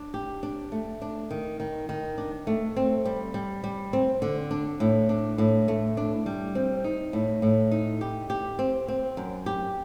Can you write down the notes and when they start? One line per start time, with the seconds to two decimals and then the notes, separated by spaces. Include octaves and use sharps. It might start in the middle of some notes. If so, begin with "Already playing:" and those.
Already playing: D4
0.14 G4
0.43 D4
0.72 A3
1.02 D4
1.31 D#3
1.60 D#3
1.89 D#3
2.18 D4
2.47 A3
2.76 C4
3.05 G3
3.34 G3
3.64 G3
3.93 C4
4.22 D3
4.51 D4
4.80 A2
5.09 D4
5.38 A2
5.68 A3
5.97 D4
6.26 G3
6.55 C4
6.84 D#4
7.13 A2
7.42 A2
7.71 D#4
8.01 G4
8.30 G4
8.59 C4
8.88 C4
9.17 F#2
9.46 G4